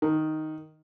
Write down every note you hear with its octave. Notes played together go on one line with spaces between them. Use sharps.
D#3